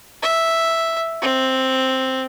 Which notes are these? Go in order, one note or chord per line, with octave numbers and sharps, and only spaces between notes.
E5
C4